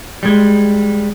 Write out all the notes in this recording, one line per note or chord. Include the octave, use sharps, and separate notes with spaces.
G3 G#3